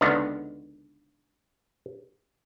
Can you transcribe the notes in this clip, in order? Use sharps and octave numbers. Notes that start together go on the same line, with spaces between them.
C#2 D3 D#3 B3